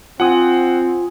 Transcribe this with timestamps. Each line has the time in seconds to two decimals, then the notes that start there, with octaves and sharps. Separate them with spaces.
0.20 C4 F4 F#5 G#5 D#6